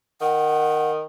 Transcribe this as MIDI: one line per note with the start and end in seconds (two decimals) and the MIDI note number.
0.21 1.04 51
0.21 0.91 78